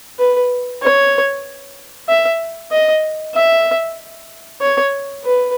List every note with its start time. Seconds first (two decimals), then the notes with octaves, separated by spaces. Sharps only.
0.19 B4
0.82 C#5
2.09 E5
2.72 D#5
3.35 E5
4.61 C#5
5.24 B4